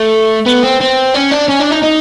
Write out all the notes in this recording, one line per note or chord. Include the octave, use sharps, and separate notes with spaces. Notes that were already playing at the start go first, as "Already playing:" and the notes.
Already playing: A3
B3
C4
C4
C#4
D4
C#4
D4
D#4
D#4